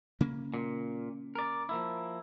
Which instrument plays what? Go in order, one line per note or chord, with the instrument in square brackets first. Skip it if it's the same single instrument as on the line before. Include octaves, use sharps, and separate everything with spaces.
[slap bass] C#3 A#3 C#4
[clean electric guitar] A#2
A#4 D5
F3 A#3 E4